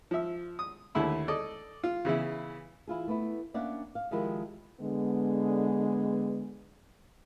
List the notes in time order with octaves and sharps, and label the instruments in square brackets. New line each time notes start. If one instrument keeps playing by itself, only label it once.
[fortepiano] F3 E5
D#6
D#2 D3 A3 E4 B5
A4 D5 D#5
F4
C#3 E3 B3 E4
[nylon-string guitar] E3 E4 F4 G#4
A3 B3 E4
A#3 C#4 D4 D5 E5 F#5
F5
D#3 F3 G#3 E4 G4 A#4
[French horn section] D3 G#3 B3